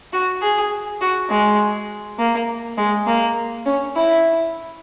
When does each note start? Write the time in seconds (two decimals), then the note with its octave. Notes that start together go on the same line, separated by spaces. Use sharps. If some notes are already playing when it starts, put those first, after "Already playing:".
0.13 F#4
0.42 G#4
1.01 F#4
1.30 G#3
2.19 A#3
2.78 G#3
3.07 A#3
3.66 C#4
3.96 E4